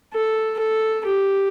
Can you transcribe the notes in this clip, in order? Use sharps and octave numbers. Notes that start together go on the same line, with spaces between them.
A4
A4
G4